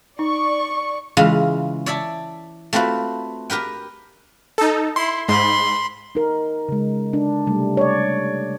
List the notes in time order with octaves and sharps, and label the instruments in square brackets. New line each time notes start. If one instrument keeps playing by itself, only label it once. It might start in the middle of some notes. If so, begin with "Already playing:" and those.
[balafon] D#4 [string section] D5 C#6
[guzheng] C#3 E3 G#3 F4
C#5 D5 E5 A5
A3 C4 F4 F#4 B4
G4 A#4 B4 G5
[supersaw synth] D#4 A4
[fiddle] E4 [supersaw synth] C6
[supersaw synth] G#2 [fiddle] B5 C6
[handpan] D#4 A#4
C#3 G#3
D4
C3 G3 A3
C#5 D5